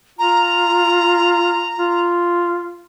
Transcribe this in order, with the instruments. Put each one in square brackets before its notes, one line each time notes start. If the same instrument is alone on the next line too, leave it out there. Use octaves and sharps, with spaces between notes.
[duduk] F4 [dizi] A#5
[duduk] F4